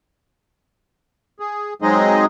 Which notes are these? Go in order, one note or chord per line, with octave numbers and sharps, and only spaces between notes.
G#4
F#3 G#3 C4 D#4 G#4 D#5